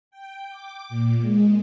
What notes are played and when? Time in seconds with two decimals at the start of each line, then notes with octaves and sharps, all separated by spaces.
0.11 G5
0.50 D6
0.89 A#2
1.21 G#3